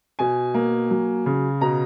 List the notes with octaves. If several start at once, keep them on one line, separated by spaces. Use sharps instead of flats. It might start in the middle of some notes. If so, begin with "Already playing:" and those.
B2 G#5
A#3
F#3
C#3
B2 A#5